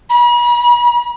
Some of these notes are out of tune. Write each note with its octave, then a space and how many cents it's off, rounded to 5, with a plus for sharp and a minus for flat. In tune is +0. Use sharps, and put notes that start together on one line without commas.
B5 -45